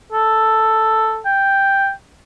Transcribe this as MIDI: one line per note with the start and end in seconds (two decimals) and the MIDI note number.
0.12 1.20 69
1.25 1.90 79